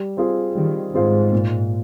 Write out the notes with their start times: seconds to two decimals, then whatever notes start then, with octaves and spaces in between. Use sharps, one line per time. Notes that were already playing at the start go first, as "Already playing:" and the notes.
Already playing: G3
0.17 C4 F4 G#4 C5
0.55 D#3 G3
0.94 G#2 C4 F4 G#4 C5
1.32 A#2